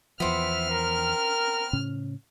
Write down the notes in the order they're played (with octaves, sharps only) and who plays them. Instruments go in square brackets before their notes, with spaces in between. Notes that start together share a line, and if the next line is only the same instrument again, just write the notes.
[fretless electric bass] E2 F3 [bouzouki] B3 C4 [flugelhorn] E5 [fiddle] F6
[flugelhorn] A#4
[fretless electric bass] A2 C#3 C#4